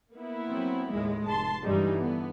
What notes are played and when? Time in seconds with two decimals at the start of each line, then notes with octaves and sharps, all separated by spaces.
0.15 A#3 B3 E4
0.50 F#3 C4
0.91 D#2 A2 G#3
1.26 F1 A5 C6
1.64 G2 E3 G3 G#3 D#4
1.98 D3 B3